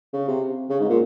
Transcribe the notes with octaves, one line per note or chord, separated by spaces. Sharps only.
C#3
C3
C#3
G#2
A#2